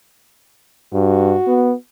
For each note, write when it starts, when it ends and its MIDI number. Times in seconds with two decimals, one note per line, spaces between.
0.93 1.35 43
0.93 1.74 66
1.47 1.73 59